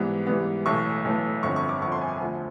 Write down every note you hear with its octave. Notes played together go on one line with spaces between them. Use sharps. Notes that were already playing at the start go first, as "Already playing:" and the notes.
Already playing: G#2 E3 G3 B3
G#2 E3 G3 B3
B1 A2 E3 A3 C#6
B1 A2 E3 A3
G1 F2 D3 C#6
C#6
D6
G1 F2 D3 C#6
C6
G#5
D2 D3 F3